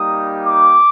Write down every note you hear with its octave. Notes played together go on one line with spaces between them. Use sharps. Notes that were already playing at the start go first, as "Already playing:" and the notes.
Already playing: G3 A#3 D#4 G4 D#6
D6